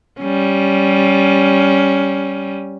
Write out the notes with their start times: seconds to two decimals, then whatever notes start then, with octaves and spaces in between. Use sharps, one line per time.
0.21 G3 C#4